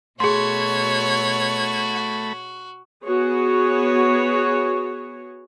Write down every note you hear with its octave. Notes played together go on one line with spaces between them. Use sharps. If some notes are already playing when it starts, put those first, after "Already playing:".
B2 A3 F#4 G#4 C#5 B5 C6 G#6
B3 F#4 G#4 C#5